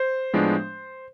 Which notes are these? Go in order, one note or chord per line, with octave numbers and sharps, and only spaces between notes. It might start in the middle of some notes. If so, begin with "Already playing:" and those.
Already playing: C5
A2 F3 G#3 B3 D4